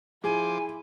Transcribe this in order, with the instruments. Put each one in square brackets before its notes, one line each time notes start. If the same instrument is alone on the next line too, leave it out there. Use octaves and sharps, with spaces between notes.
[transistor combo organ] F3 C6 D6 [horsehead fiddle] E4 [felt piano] G#4 [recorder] G#5